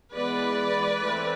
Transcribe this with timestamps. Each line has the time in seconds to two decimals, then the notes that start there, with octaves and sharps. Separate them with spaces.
0.14 E3 G#3 B3 B4 D5
0.96 E3 A3 C4